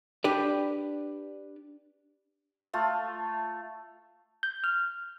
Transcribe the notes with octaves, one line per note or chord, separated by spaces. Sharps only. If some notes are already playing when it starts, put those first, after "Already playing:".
D4 G4 B4 D5
A3 F4
G6
F6